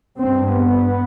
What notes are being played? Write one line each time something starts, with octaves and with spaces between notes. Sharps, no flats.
G2 C4
B3